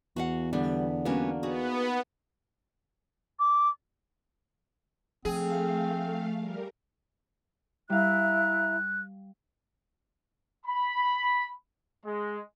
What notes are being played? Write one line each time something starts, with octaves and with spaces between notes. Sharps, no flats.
E2 F#4 F5 F#5
D3 G3 B3 D4
G3 A#3 B3 C#4 D4 F#4
B3 D#4 F#4 G#4
D6
F3 A3 C4 G#4 F5
G3 A#4
G3 E4 E5 F5 A#5 F#6
B5
G#3